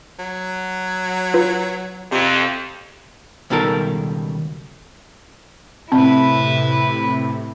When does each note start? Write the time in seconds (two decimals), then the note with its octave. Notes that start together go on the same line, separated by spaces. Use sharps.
0.19 F#3
1.34 F4 B4
2.12 F2 C3
3.50 C#2 B2 D#3 G3 A4 A#4
5.92 A2 C3 C4 E4 B4